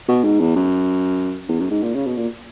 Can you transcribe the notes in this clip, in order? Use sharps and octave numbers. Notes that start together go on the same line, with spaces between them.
B2
G#2
E2
F#2
E2
F#2
G#2
A#2
C#3
B2
A#2